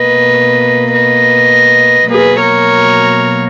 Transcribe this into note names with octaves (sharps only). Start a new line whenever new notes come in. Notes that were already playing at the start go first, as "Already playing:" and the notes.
Already playing: B2 A#3 B4 D#5
B4 D#5
B2 F#3 A#3 G#4 B4
A#4 C#5